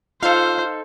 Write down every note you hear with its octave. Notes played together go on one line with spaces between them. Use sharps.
D#4 F4 A4 C5 F5